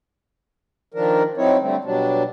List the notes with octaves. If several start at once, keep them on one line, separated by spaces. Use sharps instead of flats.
D#3 F3 D4 A#4
F#3 C4 D#4 E4 C#5
D3 G3 A3 C4
B2 F#3 G3 D4